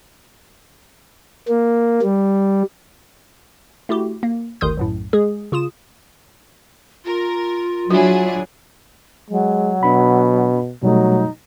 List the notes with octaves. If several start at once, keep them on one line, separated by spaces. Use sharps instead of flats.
A#3
G3
A3 E4 F#4 G4
A#3
G1 D2 D#3 C6 D#6 G6
B1 F#2 A2
G#3 G#4
C#3 F4 D#6 E7
F4 A#4
F#3 D4 E4 F#4 G#4
F#3 G#3
B2 D4 B5
B2 F#3 G3 A3 D#4